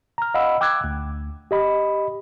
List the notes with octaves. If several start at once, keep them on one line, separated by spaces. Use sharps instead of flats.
A#5 F6
D#5 F5 F#5 B5 E6
G5 D6 E6 F#6 G#6
D2
G4 D#5 B5